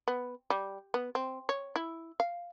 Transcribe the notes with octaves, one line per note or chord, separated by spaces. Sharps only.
B3
G3
B3
C4
C#5
E4
F5